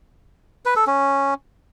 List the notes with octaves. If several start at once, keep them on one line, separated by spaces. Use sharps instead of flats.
B4
A4
C#4